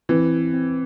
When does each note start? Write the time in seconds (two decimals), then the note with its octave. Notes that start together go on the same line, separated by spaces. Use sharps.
0.09 E3 C4
0.54 C4